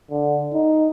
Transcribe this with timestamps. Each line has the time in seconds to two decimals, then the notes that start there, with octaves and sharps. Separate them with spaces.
0.11 D3
0.54 D#4